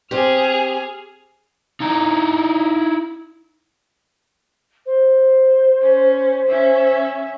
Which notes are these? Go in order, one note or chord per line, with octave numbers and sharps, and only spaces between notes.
C4 G4 G#4 F6
D#4 E4 A#5
C5
C#4
C#4 E5